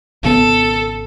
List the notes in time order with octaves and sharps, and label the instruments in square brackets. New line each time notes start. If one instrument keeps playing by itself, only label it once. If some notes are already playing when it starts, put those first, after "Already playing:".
[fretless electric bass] G#1 C#3 B3 [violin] A4